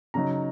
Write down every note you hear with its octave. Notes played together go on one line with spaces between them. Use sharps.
C#3 F#3 D#4 A#5